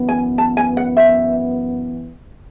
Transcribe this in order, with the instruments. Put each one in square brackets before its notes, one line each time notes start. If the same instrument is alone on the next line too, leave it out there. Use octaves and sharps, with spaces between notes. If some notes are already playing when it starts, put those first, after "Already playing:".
Already playing: [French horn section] F#2 E3 B3
[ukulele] G#5
A5
G#5
F#5
E5